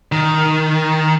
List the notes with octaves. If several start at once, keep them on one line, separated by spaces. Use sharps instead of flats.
D#3